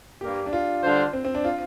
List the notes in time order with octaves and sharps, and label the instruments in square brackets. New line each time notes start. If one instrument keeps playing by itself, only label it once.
[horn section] G2 G3 A#3 [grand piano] G4
[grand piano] D4
F4
[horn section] D3 G3 D4 F4 C5
[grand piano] C4
C4
D4
F4